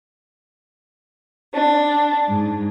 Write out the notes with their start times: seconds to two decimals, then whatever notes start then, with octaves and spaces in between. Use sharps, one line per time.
1.54 D4
2.30 G#2